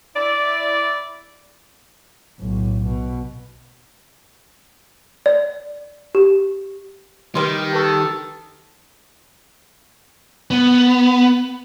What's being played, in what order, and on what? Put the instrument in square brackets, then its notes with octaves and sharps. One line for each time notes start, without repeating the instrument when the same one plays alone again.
[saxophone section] E4 D5
[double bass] B1 A2
B2
[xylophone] D5
G4
[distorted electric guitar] D#3 [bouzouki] G3 G4 [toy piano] B4 B5 C6
[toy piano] D#4 B4 C#6 [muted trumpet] A4
[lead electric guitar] B3